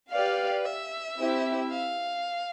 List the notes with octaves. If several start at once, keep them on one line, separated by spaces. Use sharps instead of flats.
G4 B4 D5 F5
E5
C4 E4 G4
F5